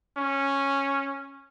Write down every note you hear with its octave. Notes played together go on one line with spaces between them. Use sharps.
C#4